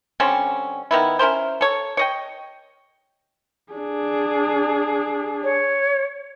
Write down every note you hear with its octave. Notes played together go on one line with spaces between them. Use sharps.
D3 G3 C4 C#4
D#3 B3 E4
C#4 E4 A#4 C5
A4 C#5
C#5 D#5 G5
D4 G#4
C#5